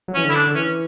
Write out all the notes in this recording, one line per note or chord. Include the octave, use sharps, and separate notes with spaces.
F#3
E3 C#4
D3 E4
D4
D3
E3 C#4